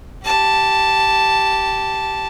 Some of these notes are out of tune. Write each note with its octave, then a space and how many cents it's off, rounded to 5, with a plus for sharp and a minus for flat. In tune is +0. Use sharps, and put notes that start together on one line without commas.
G4 -15 A5 +0